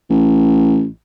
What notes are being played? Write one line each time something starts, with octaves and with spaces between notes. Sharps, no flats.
A1